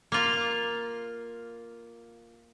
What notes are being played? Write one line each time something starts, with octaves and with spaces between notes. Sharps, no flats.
A#3 F4